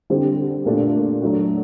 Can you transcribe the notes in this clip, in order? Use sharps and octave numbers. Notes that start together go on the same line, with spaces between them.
D3 G3 C4 G4
A#2 A3 D4 G4
F#3 A3 D4 F#4